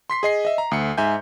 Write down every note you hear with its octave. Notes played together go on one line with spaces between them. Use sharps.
C6 B6 C7
G#4 D#5 C7
D#5 E5
A#5
D2 C#7
G#2 E5 G#5 G6